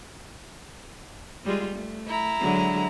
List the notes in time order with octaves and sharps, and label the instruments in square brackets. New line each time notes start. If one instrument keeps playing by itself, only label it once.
[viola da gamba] G3 G#3 F4
A3
[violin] E4 A#5
[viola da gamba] D3 F#3 G#3